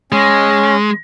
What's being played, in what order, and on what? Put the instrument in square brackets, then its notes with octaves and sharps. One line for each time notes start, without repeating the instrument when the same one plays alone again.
[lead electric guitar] G#3 [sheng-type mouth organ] C#4